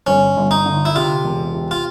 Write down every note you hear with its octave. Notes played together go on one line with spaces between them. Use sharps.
G1 C#4
G1
D#4
D3
E4
C3 F4
E1
C3
F4